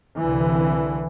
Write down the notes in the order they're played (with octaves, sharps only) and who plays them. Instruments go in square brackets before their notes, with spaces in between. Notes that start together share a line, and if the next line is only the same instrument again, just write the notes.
[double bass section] C2 D3 E3